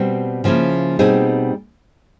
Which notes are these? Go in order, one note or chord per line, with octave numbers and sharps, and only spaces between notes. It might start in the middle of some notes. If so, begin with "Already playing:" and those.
Already playing: B2 G3 C4
C#3 F3 A#3 C#4 E4
B2 G3 C4 D#4 G#4